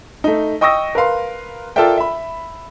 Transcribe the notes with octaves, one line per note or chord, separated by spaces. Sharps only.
A3 D#4
D#5 G5 C#6 D#6 E6 A#6
A#4 B4 F5 C6
F4 A4 A#4 D5 E5 G5
E5 B5